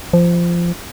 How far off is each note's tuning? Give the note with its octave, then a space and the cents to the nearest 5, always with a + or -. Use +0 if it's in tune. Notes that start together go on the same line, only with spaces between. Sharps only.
F3 -15